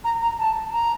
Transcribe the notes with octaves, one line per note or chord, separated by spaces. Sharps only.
A#5
A#5
A5
A#5